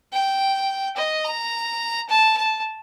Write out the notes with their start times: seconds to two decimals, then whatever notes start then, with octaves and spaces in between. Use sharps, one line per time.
0.12 G5
0.97 D#5
1.25 A#5
2.09 A5
2.37 A5